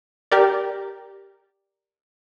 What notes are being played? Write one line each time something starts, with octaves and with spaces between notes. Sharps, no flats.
G4 A#4 D5